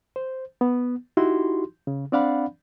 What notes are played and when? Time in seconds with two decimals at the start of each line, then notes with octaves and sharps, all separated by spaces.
0.16 C5
0.61 B3
1.17 D#4 E4 F#4 G4 C6
1.87 C#3
2.12 C4 D4 D5 F5 F#5 B5